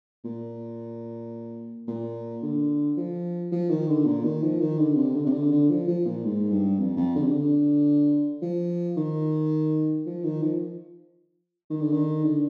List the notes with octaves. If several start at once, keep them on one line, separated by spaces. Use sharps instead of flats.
A#2
A#2
D3
F3
F3
D#3
D3
A#2
D#3
F3
D#3
D3
C3
D3
C3
D3
D3
F3
F3
A#2
G#2
G2
F2
F2
D3
C3
D3
F3
D#3
F3
D#3
F3
D#3
D3
D#3
D3